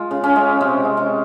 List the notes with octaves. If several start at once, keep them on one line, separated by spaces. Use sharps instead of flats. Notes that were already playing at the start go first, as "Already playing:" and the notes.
Already playing: G#3 F4
C#3
C#4
G#3
C3 C4
G#3
C#4